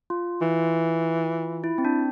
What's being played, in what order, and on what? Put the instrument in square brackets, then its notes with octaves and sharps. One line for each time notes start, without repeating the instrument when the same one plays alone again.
[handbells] F4
[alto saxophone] E3 [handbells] F4
[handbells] E4
C4
D4